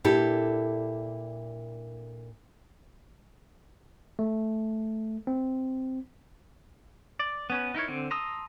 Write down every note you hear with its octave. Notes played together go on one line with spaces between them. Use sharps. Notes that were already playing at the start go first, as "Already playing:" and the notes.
A#2 D4 E4 G4 A4
A3
C4
D5
B3 C#4 B4
D#4 E4 A#4 C#5
D3 C4
A5 A#5 C6 D#6 E6